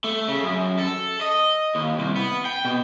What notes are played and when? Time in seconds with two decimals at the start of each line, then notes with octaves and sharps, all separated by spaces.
0.04 A3
0.28 C#3
0.43 F#2
0.79 A4
1.21 D#5
1.75 D#2
1.99 C2
2.16 B3
2.45 G5
2.65 B2